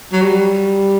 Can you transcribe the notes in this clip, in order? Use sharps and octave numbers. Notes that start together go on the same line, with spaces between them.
F#3
G3